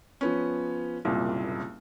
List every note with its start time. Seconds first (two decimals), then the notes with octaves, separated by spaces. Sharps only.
0.21 F3 B3 C#4
1.05 F#1 C2 A#2